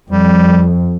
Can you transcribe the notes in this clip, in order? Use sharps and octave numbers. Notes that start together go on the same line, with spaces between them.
F2 G3